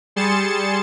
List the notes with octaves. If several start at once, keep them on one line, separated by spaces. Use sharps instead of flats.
G3 G#4 C6 A6 C#7 E7